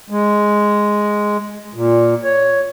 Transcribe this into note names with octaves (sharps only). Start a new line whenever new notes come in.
G#3
A#2
C#5